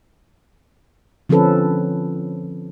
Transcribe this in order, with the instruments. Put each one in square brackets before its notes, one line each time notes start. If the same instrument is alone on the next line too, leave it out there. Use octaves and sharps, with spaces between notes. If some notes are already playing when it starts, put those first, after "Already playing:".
[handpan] D3 F3 C4 C#4 A4 B4